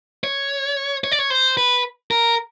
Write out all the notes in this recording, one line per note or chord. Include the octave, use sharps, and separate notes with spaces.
C#5
C#5
D5
C#5
C5
B4
A#4